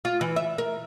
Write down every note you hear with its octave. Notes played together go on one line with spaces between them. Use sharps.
F4
E3
E5
A#4